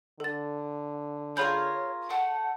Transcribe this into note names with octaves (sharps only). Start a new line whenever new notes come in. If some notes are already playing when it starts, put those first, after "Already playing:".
D3 A4 A6
C#4 F4 G#4 A#4 C#5 B5 G6
A3 F#5